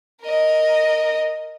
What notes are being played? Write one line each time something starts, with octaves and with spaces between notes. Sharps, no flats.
A#4 D#5